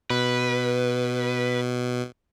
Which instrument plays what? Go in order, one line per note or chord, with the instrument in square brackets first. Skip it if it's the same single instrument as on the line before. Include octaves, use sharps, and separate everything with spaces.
[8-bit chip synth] B2 [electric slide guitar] B4